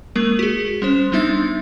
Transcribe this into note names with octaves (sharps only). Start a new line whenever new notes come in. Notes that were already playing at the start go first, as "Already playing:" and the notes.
G#3 A#3 A#4
F#4 G#4
G3 C#4 C5 E7
G3 B3 D4 D#4 E5 A6